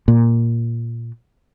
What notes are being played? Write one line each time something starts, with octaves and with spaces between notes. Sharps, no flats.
A#2